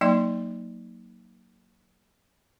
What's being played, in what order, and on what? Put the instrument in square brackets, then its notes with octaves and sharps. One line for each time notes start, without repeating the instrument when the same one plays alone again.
[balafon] F#3 A#3 D#4 D5 G5 C6